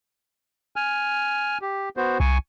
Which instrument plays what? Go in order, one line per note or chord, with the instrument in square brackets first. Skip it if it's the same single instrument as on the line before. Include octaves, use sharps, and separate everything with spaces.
[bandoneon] G#5 F6
G4
B3 F#4 C5
[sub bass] C2 [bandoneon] G#5 C#6